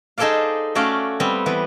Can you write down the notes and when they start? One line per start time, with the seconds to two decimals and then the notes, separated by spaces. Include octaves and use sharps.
0.18 D#4 G#4 A4 C5 D5 F5
0.75 A3 C#4 F#4 D5 F5
1.20 G3 B3 C4
1.46 E3 B3